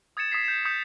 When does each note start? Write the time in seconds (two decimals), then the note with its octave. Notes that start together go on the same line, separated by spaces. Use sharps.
0.17 D#6 G#6 A6 C#7 E7
0.32 D#6 G#6 B6 C7
0.44 G6 E7
0.65 D#6 G6 B6 C#7